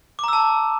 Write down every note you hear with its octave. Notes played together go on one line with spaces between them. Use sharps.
A5 A#5 D6 E6